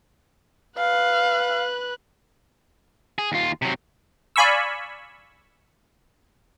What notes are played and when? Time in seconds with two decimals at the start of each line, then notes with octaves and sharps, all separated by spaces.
0.78 B4 F5 F#6
3.18 G#4
3.32 D#2 F4
3.62 C3 F#3
4.36 D5 F5 G#5 B5 C#6 E6